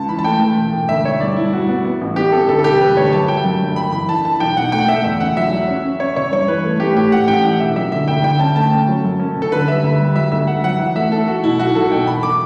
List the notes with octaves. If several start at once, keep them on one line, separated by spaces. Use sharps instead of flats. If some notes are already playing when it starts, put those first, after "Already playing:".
Already playing: C#2 A5
E3 B5
A5
A3 G5
E3
E1
E1
D2 E5
E1 C#5
G2 D5
G2 E4
G2 F#4
B3
B3
A1
B3 G4
B3 A4
D2 A4
A4
E1 G4
E1 B4
D2 C#5
F#2 A5
F#3 G5
F#2
G1
F#1 B5
E3 B5
E3 A5
E3 A5
B1 G5
B2 F#5
A3 G5
F#5
A3 E5
E2 E5
C#3 F#5
F#3 E5
F#3
C#4
C#4
C#4 C#5
C#3 C#5
G2 C#5
E3 B4
A3
A3 G4
A2 G4
A2 F#5
A1 G5
E3 F#5
E1 E5
F#3 E5
D3 E5
D2 G5
D3 G5
C#4 A5
A3 A5
C#4
F#3
F#2
C#4
C#3
A4
D3 B4
G3 E5
D2
G3
F#3 E5
D2 E5
D2 F#5
F#3 F#5
E3 F#5
A3 E5
A3 A4
A3 F#4
B2 E4
B1 F#4
B1 A4
B2 G5
E1 B5
D6